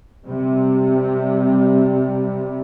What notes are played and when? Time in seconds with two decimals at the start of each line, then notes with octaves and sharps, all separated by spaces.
0.25 C3 G3